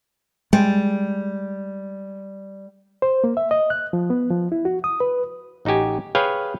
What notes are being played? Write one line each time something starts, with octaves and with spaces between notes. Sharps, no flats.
G3 G#3
C5
A#3
E5
D#5
F#6
F3
B3
F3
E4
F#4
D#6
B4
A1 D#4 F#4 G4 G#5
G#4 B4 C#5 F5 G5 G#5